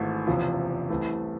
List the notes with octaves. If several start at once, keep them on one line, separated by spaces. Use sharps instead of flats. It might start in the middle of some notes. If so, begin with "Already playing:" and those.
Already playing: G#1 G#2 E3 A3
F#1 E2 C3 F3
C2 C3 E3 A3